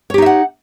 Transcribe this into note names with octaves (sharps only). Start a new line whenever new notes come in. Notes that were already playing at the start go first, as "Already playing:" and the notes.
D#4 G4 C#5 E5 F#5